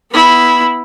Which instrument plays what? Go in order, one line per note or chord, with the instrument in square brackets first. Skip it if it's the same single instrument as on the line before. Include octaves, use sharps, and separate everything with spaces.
[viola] B3 E4